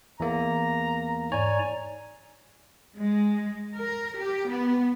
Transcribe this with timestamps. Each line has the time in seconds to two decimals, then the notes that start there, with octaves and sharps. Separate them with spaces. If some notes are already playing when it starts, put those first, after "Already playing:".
0.20 E2 A#3 A#5
1.32 G#2 C#5 D5 G#5 A#5
3.00 G#3
3.77 A#4
4.18 G4
4.49 B3